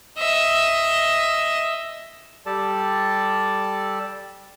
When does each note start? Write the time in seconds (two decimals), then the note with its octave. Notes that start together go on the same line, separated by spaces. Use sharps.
0.18 D#5 E5
2.46 G3 G4 A4 D5 A5